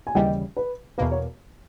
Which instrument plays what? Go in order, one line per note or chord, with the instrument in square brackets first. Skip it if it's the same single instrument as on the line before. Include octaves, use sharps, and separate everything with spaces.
[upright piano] G#5
[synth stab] D#2 C#3 E3 G3 [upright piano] D#5 G5
[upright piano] B4
[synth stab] E2 B2 A#3 [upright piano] B4
[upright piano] C#5